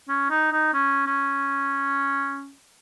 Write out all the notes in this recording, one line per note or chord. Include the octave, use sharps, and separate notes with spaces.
C#4
D#4
D#4
C#4
C#4